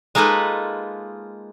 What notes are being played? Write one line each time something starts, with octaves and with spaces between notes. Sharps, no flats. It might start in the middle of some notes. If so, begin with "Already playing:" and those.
G#3 A#3 D#4 F4 A4 B4